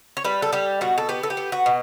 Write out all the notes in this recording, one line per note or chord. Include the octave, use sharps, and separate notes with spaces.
C#5
G3 B4
A4
G3 G4
B2 F#4
A4
B3 G4
A4
G4
B3
F#4
B2